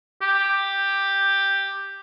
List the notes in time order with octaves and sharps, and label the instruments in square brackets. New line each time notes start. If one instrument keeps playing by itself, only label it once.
[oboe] G4